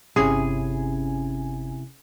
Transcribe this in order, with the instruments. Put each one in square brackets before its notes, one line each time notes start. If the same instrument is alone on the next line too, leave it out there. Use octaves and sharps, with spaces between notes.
[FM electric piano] G1 C#4 G#5 [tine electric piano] C3 E4 [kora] G#4